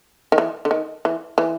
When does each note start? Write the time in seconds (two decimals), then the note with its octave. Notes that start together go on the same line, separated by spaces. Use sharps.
0.32 D#3
0.38 E3
0.65 D3
0.71 D#3
1.05 E3
1.38 E3